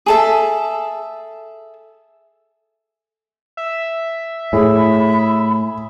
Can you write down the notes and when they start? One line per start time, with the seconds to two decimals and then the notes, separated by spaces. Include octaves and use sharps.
0.06 G#4 A4 E5
3.57 E5
4.53 A2 G#4 B5